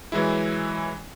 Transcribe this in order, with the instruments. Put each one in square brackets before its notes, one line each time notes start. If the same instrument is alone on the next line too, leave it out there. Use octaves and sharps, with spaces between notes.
[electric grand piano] E3 F#3 G#3 E4